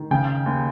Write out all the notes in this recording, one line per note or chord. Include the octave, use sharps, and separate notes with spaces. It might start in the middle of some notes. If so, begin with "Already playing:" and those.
Already playing: D#3
C#3 G5
D#2